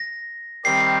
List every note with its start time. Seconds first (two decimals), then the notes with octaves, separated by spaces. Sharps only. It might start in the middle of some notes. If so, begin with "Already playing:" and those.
Already playing: A#6
0.64 D#3 G3 C4 G4 C7